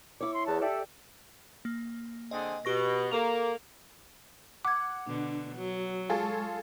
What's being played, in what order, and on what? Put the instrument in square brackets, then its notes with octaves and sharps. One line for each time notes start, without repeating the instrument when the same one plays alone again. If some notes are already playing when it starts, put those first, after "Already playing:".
[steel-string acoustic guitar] E4 C#5 [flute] D6
[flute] C6
[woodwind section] E2 [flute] A5
[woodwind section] G4 A4 D5 [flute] E5
[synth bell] A#3
[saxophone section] D3 C4 G#4 [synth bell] D#5
[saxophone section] B2 [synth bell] G4 C#6 A#6
[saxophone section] A#3 [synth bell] A4 A#4 F7
[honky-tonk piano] F#5 [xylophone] D6 G#6
[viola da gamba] B2 D3 [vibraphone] D4
[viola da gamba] F#3 [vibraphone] F#4
[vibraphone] G#3 A5 C#6 [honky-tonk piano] F4 G#4 A4